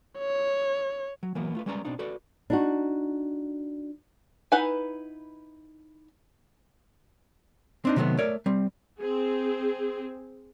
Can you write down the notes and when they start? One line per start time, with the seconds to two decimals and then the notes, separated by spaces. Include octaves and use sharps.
0.19 C#5
1.23 F#3
1.35 E3 F#3 A#3 B3
1.54 A3 F4 B4
1.66 G3 G#3 C#4 B4 D5 A#5
1.85 B2 C4 D4 D#4
1.99 F#4 A4 B4 D5
2.50 D4 D#4 F#4
4.52 D#4 E4 B4 F#5 G#5
7.85 C4 D4 D#4
7.96 C3 D#3 F#3 G#3 A3 B3
8.18 A3 A#4 C#5 D5
8.46 G3 C4
8.99 C4 G#4